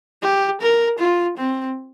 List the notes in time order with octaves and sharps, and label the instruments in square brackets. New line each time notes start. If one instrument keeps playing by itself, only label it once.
[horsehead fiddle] G4
A#4
F4
C4